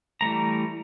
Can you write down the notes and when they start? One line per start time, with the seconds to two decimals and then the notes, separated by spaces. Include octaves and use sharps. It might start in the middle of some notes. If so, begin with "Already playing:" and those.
0.21 E3 G3 A3 A#5